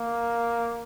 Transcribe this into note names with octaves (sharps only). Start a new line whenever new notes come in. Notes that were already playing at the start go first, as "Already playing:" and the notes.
Already playing: A#3